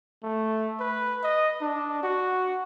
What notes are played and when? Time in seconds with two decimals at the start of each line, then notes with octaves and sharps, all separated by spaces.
0.23 A3
0.80 B4
1.24 D#5
1.61 D4
2.03 F#4